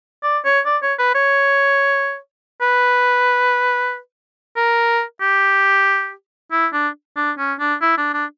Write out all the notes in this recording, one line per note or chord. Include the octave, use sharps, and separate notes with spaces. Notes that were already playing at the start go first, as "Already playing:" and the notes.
D5
C#5
D5
C#5
B4
C#5
B4
A#4
G4
E4
D4
D4
C#4
D4
E4
D4
D4